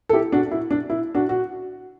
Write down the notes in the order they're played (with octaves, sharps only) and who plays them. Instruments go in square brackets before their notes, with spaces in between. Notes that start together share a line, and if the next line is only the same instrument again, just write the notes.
[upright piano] A4
E4 G4
D4 F#4
E4
D4
E4
D4 F#4
F#4